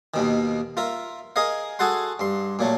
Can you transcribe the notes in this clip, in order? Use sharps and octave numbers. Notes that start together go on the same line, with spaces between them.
D#2 B2 D#3
F4 A#4 E5
G#4 A#4 D#5 F5
F#4 G#4 A4 F#5 C6
G2 C6
A#2 F#3 A3